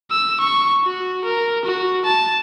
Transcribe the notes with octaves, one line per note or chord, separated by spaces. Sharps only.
E6
C#6
F#4
A#4
F#4
A5